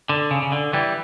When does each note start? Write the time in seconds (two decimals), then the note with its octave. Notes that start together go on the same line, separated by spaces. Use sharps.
0.09 D3
0.31 C#3
0.43 C#3
0.52 D3
0.73 E3 G3